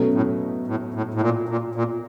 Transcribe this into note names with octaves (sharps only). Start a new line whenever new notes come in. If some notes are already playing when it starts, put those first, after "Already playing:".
Already playing: B2 F#3 A3 C#4
A2
A2
A2
A2
A#2
A#2
A#2